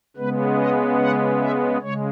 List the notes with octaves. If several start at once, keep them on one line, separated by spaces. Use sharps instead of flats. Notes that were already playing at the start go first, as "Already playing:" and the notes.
C#3 G#3 B3 B4
D#5
F#5
E5
C#3 G#3 C#5